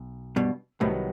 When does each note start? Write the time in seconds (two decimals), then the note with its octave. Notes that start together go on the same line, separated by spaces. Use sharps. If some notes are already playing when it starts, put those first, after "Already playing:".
Already playing: B1
0.36 G2 B2
0.80 C2 A2 C3 D#3 F#3 B3